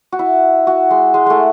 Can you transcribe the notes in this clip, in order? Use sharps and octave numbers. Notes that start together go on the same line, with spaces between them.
F#4
E4
F#4
G#3
G#3
G#3 A3